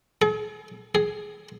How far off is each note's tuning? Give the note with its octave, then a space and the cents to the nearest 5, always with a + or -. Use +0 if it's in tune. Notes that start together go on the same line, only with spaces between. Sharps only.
G#4 +45
G#4 +10